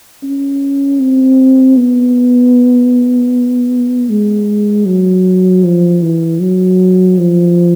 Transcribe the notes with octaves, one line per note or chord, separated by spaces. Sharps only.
C#4
C4
B3
G#3
F#3
F3
E3
F#3
F3